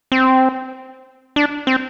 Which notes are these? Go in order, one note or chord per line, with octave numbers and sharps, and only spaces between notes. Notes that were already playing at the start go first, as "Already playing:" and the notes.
C4
D4
C4